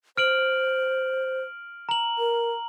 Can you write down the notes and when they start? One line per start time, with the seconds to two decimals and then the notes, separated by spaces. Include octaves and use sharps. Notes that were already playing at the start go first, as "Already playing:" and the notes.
0.17 C5 F6 D7 F#7
1.89 A#5 F#7
2.18 A#4